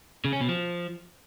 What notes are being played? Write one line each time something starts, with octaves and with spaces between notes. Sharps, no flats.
C#3
C#4
B2
F3